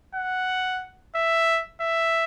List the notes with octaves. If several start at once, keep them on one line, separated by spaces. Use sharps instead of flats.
F#5
E5
E5